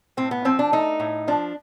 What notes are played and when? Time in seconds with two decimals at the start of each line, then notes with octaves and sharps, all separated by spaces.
0.17 A2 C4
0.31 B3
0.45 F3 C4
0.59 D4
0.72 A3 D#4
1.00 A2
1.27 F3 D4